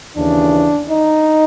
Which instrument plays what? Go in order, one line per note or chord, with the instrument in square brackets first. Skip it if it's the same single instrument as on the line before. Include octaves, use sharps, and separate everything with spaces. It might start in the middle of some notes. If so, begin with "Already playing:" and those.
[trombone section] D#2 C#3 E3 D4
D#4